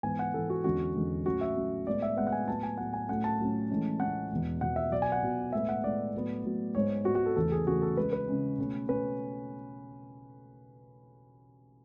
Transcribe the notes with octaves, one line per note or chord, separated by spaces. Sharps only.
G#2 E3 B3 G#5
F#5
G#2 E3 B3 A4
F#4
E2 D3 G#3 C#4 F#4
E2 D3 G#3 C#4
A2 F#3 C#4 F#4
E5
A2 F#3 C#4
A2 G#3 B3 D5
E5
A2 G#3 B3 F#5
F#5
G#5
A2 F#3 B3 A5
G#5
A2 F#3 B3 F#5
G#5
A2 F#3 A3 C#4 F#5
A5
A2 F#3 A3 C#4
A2 E3 G#3 C#4
A2 E3 G#3 C#4 F#5
E2 B2 G#3
E2 B2 G#3 F#5
E5
B2 F#3 B3 D5
G#5
F#5
B2 F#3 B3
A2 G#3 B3 E5
F#5
A2 G#3 B3 D5
A2 F#3 B3
A2 F#3 B3
G#2 G#3 B3 C#5
G#2 G#3 B3 F#4
F#4
A4
E2 C#3 E3 A3 A4
G#4
E2 C#3 E3 A3 F#4
A4
C#3 G#3 C#4 B4
B4
C#3 G#3 C#4
B2 A3 C#4
B2 A3 C#4 B4